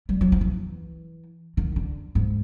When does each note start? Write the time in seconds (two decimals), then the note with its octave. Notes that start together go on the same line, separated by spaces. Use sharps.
0.09 G3
0.21 F#3
0.32 F3
0.41 E3
1.57 D#3
1.76 D3
2.15 G#2